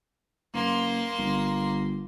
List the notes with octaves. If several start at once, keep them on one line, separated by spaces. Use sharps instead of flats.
F#1 A#3 C6
G1